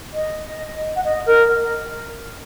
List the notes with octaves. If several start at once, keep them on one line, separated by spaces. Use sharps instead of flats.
D#5
F#5
D#5
A#4